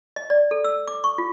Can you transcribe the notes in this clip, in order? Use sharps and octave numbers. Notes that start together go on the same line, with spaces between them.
D#5
D5
A4
E6
D6
C#6
F4